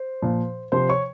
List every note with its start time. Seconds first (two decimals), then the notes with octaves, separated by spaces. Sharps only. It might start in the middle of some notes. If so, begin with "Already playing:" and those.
Already playing: C5
0.22 A#2 F3
0.72 C3 F3 C5 C6
0.89 C#5 C#6